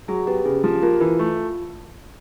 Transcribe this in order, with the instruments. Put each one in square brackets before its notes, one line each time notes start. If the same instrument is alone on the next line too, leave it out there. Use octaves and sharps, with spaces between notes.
[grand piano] F#3 [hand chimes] G#4
[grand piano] B3 [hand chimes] G4
[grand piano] C#3 [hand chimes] G#4
[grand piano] F3 [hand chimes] G4
[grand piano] A#3 [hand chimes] F4
[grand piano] E3
A3